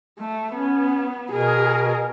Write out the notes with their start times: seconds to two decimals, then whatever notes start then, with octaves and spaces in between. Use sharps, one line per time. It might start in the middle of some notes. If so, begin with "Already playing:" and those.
0.18 A3
0.53 B3 C#4
1.32 B2 G#4 A#4